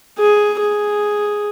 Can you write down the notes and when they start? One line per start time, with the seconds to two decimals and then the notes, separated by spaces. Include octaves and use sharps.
0.19 G#4
0.60 G#4